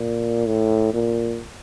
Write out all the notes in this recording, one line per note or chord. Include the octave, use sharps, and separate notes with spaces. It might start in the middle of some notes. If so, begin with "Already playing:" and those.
Already playing: A#2
A2
A#2